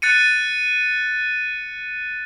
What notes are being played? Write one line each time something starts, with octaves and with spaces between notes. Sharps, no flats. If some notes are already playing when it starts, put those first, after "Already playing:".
F#6 A6 C#7 D#7